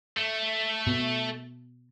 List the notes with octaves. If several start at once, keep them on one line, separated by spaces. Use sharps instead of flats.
A3
B2